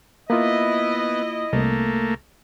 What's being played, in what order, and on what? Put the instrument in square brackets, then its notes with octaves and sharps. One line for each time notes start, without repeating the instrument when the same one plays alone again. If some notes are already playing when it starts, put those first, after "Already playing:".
[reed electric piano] A#3 F4 [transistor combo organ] B3 [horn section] E4 D#5
[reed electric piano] C2 [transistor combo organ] A3 A#3